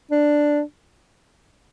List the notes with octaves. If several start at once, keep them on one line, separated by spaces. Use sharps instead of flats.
D4